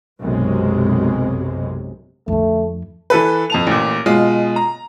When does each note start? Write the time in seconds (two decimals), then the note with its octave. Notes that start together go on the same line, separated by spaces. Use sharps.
0.21 B1 F#2 C3 G#3
2.28 F2 D3 A3
3.10 E3 A4 B4
3.50 F2 A5 F7
3.67 A1 A#2
4.06 B2 G#3 F4
4.56 A#5